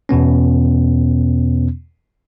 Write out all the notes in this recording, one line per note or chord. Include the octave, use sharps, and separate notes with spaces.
E2 B2 B3 C#4